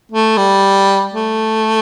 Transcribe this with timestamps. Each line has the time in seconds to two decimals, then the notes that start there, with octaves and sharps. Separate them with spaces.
0.12 A3
0.37 G3
1.14 A3